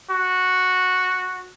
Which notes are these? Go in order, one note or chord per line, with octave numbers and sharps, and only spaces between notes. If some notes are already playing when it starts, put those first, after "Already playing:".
F#4